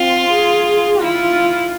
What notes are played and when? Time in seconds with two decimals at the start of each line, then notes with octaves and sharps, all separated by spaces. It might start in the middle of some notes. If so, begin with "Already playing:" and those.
Already playing: C4 F4
0.30 G#4
1.00 E4 F4